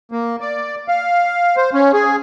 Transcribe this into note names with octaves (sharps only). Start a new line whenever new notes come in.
A#3
D5
F5
C5
C#4
G#4